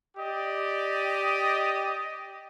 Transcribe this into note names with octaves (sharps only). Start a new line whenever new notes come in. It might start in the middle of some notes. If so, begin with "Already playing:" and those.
G4 D5 D#5